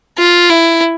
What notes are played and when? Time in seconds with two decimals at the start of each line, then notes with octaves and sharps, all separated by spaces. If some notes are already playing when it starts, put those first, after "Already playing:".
0.19 F4
0.50 E4